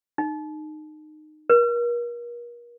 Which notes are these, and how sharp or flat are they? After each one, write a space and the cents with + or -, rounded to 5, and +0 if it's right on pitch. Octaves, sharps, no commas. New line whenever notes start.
D#4 -25
A#4 +40